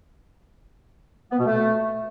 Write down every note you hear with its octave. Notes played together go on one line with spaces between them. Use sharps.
B3
B2
A3